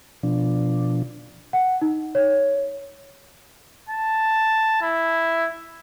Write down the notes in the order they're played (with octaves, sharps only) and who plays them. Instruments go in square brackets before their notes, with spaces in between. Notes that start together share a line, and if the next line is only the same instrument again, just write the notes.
[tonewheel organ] B2 F3 D4
[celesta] F#5
D#4
C#5
[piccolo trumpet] A5
E4